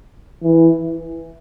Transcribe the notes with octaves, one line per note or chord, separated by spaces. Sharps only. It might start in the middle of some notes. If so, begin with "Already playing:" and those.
E3